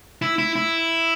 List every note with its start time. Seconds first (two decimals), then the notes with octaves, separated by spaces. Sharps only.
0.22 E4
0.38 E4
0.56 E4